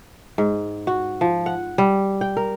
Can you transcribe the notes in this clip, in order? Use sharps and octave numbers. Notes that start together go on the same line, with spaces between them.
G#2
F#4
F3
F#5
G3
G5
A#4